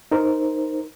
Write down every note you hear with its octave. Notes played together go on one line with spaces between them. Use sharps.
D#4 A#4 C5